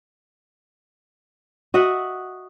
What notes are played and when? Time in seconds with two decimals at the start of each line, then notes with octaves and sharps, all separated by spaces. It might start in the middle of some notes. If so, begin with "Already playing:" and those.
1.74 F#4 D#5 E5 F#5